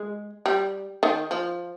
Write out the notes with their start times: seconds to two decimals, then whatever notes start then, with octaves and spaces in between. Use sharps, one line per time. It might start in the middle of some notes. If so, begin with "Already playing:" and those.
Already playing: G#3
0.46 G3
1.03 D#3
1.31 F3